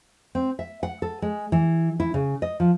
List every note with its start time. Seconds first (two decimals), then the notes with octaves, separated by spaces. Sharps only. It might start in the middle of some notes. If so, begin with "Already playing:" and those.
0.35 C4
0.59 E5
0.83 F#5
1.02 A4
1.22 G#3
1.52 E3
2.00 E4
2.14 C#3
2.42 D#5
2.60 F3